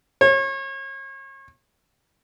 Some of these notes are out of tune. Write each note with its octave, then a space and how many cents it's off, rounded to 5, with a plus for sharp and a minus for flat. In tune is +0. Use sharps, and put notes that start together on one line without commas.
C#5 -35